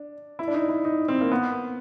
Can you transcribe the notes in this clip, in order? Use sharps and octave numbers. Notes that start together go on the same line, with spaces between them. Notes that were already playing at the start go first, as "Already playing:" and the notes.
Already playing: D4
E4
D4
D#4
E4
D#4
C4
A#3
B3